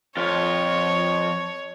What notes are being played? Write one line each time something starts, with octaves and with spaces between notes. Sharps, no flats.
F2 F4 C#5